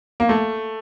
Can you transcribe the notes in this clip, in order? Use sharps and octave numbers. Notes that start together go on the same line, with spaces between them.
A#3
A3